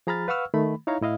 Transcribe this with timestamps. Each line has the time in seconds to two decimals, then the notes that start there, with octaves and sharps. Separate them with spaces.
0.07 F3 G#4 A#5 B5 F6 A6
0.28 B4 F5 F#5 C#6 E6 F6
0.54 D#3 A3 B5
0.87 D#4 E4 C#5 F5 A#5
1.01 A2 E4 D#5 F5